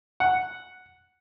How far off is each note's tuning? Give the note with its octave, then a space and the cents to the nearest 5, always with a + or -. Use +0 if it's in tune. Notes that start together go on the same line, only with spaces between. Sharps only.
F#5 +0